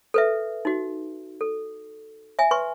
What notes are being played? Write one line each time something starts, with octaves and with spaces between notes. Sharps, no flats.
A4 B4 E5
D#4 F#4
A4
E5 G#5
B4 C6 C#6